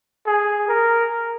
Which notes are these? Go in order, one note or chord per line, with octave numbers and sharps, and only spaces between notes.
G#4
A#4